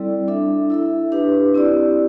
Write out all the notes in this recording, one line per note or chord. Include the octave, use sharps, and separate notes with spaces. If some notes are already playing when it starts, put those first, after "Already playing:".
Already playing: G3 C4 E4 A4 D5
D4 A4 E5
E4 A4 E5
D4 G4 B4
C4 E4 G4 D5